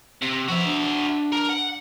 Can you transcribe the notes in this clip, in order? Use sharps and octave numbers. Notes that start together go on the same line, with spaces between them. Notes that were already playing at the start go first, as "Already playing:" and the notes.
C3
F3 F#4 E5
D4
A#4
F#5